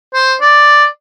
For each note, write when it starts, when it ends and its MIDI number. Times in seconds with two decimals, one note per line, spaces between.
0.14 0.34 72
0.41 0.85 74